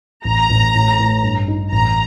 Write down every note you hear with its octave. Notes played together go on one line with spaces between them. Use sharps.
A1 A#5
A1
A2
A2
G2
D#4
A1 A#5